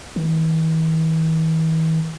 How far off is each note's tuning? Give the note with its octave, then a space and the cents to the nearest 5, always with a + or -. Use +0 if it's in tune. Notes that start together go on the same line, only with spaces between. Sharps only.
E3 -45